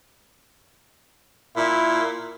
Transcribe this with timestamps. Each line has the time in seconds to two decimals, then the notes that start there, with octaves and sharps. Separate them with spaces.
1.56 A#2 E4